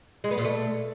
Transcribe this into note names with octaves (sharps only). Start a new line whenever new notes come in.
G#3
B3
A#2
A3